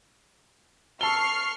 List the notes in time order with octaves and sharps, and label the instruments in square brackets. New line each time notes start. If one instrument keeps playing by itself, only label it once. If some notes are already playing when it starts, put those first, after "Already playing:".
[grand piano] A5 E6 G7 [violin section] C#6 F6 C7